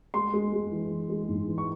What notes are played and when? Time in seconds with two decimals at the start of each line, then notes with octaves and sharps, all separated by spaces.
0.14 G#3 C6
0.34 G#3
0.53 G#3
0.72 E3
0.90 E3
1.09 G#3
1.29 G#2
1.48 E3
1.58 C#6